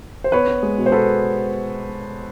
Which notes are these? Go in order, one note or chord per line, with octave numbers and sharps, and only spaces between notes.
C5
B3 B4 C#5
B3
G#3
B2
C5
B3 A4 B4